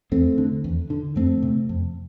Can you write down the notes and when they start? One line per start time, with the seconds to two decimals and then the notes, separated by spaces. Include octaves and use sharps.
0.12 E2 A3 C4
0.38 D3
0.64 E2
0.90 D3
1.16 F2 A3 C4
1.43 C3
1.69 F2